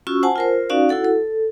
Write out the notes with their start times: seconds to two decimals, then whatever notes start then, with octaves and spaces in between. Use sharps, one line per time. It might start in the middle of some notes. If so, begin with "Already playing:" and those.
0.07 C#4 F4 F#4 C#6 E6
0.23 C5 F#5 G#5 A5
0.36 F4 A#4 C5
0.70 C#4 D#4 F#4 D5 F5
0.89 E4 F#4 A4 F#5
1.05 A4